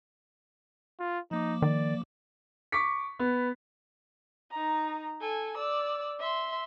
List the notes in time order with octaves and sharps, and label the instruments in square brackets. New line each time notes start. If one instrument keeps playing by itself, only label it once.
[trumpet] F4
[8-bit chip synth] F3 A#3 D6 [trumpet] D#4
[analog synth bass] D#3 [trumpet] D5
[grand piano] C#6 D6 B6
B3
[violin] D#4 A#5
A4 G#5
D5 E6
E5 C6